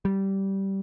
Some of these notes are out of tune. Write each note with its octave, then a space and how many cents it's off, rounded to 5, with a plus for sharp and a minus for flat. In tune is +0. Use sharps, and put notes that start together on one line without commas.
G3 -15